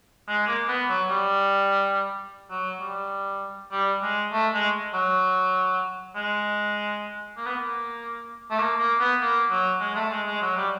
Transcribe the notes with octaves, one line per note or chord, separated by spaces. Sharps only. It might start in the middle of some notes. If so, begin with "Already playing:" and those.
G#3
A#3
B3
F#3
G3
F#3
G3
G3
G#3
A3
G#3
F#3
G#3
A#3
B3
A#3
A3
A#3
A#3
B3
A#3
F#3
G#3
A3
G#3
G#3
F#3
G3